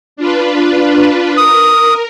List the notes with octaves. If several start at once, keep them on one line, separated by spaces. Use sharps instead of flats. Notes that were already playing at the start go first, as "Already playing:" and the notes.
D4 F4 B4
A#4 D#6